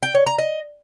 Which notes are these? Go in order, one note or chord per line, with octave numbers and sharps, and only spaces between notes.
G5
C#5
A#5
D#5